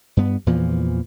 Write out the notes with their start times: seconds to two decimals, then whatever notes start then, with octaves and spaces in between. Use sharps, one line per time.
0.17 G2 B3
0.46 E2 A#2 E3 F3